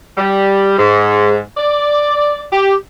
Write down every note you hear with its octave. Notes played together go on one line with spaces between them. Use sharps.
G3
G#2
D5
G4